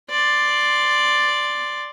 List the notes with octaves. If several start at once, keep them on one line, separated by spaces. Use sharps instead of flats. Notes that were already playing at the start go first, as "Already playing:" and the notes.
D5 C6